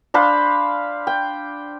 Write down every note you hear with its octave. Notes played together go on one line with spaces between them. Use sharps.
D4 C5 F5 B5
G5